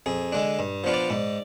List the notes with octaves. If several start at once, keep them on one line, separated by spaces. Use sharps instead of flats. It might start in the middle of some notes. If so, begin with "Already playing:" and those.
F2 G#4
D3 G#3 D4
G2
F3 B3 D4 F4
D5
G#2